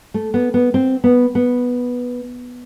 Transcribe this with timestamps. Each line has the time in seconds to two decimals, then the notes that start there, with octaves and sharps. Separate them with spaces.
0.14 A3
0.34 B3
0.54 B3
0.74 C4
1.04 B3
1.35 B3